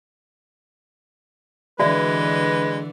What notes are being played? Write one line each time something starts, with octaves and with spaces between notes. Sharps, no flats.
D3 E3 G#3 F#4 B4 D5 E5